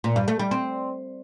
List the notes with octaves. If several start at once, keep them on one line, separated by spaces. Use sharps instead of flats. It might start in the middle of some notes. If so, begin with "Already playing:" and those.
A#2
G2
A3
G3
C4